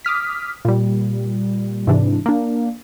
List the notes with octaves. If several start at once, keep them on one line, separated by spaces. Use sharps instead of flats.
D6 D#6 F6 B6
A#2 G3
G#2 C3 E3 D4
A#3 D4